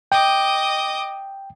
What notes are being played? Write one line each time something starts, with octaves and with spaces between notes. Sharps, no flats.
D#5 G5 D6